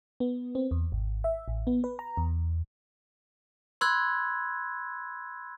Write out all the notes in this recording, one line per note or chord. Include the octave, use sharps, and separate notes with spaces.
B3
C4
E2
G#1
E5
A1
B3
B4
A#5
E2
B5 C6 E6 F#6 G#6